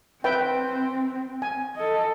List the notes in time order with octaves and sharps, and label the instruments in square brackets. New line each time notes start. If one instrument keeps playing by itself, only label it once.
[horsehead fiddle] C4 [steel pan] B4 E5 G5
[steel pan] G#5
[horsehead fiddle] A4 D#5